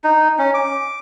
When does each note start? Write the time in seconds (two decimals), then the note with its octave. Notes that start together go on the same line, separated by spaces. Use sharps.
0.04 D#4
0.39 C#4
0.54 D6